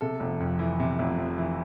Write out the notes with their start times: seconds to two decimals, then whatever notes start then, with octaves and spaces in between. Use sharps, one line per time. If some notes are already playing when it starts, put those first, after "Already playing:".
0.01 C3 A4
0.20 F1
0.40 F2
0.59 E3
0.80 C3
0.99 F1
1.18 F2
1.38 E3